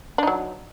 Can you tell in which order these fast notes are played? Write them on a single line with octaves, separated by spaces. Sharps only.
D4 D#4 F#3